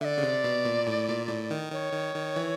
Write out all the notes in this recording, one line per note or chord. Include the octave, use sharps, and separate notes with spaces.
D3 D5 E5
C#3
C3
B2
A#2
A2
A#2
A2
D#3
D#3 C#5
D#3
D#3
E3